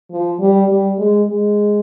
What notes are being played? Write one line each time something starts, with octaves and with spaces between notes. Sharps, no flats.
F3
G3
G3
G#3
G#3